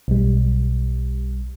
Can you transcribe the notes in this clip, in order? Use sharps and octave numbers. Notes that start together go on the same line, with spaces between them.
B1 G3